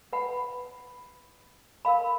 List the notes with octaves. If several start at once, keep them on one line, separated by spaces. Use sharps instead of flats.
B4 F#5 B5
A#4 F5 B5